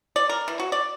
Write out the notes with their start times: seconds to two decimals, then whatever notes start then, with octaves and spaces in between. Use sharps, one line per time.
0.16 D5
0.29 A#4
0.48 E3
0.60 F#4
0.72 D5